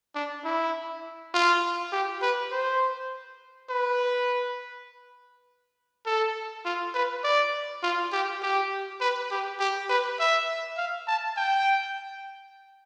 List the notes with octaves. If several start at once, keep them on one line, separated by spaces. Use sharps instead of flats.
D4
E4
F4
G4
B4
C5
B4
A4
F4
B4
D5
F4
G4
G4
B4
G4
G4
B4
E5
F5
A5
G5